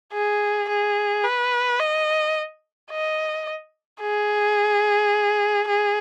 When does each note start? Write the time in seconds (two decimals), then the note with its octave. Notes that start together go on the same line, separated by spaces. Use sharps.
0.13 G#4
0.69 G#4
1.24 B4
1.80 D#5
2.91 D#5
4.02 G#4
5.68 G#4